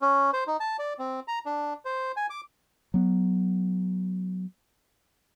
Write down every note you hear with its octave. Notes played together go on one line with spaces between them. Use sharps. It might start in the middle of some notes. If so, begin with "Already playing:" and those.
C#4
C5
D#4
A5
D5
C4
A#5
D4
C5
G#5
D6
F#3 B3